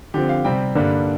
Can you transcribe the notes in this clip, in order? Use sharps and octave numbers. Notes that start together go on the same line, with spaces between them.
D3 F3 C4 G4
F5
C3 G3 C4 G5
G2 D3 G3 A#3